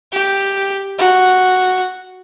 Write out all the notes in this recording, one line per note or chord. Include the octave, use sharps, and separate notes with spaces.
G4
F#4